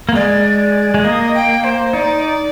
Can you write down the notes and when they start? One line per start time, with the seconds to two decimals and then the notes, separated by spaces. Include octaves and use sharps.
0.09 A#3
0.14 G#3 D5
0.94 G#3
1.04 A#3 D#5
1.34 G5
1.63 C5
1.93 D#4 D5